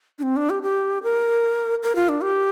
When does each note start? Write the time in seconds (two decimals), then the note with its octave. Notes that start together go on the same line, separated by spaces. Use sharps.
0.19 D4
0.23 C4
0.36 D4
0.50 G4
0.63 G4
1.03 A#4
1.83 A#4
1.95 F4
2.09 D4
2.23 G4